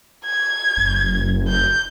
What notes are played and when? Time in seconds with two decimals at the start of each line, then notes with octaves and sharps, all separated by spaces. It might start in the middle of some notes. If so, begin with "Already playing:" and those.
0.25 G#6
0.77 F#1
1.48 G6